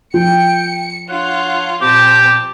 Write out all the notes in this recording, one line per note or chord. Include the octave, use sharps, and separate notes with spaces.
F3 G5 C#7
D4 F4 C#5 F#5
A#2 C4 G4 A5 D6